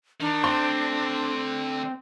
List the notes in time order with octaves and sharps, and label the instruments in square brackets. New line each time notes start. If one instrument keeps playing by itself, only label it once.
[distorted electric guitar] D#3 [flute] D4
[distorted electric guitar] D3 A3 [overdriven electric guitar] C4 [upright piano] C6